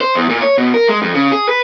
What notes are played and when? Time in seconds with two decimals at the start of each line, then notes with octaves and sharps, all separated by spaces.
0.01 C5
0.15 E2
0.29 A#2
0.42 C#5
0.58 B2
0.74 A#4
0.89 G#3
1.02 F2
1.14 C#3
1.32 G#4
1.49 B4